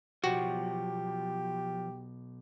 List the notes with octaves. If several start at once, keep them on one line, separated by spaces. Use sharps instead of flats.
B1 F3 B3 F#4 G4 C#5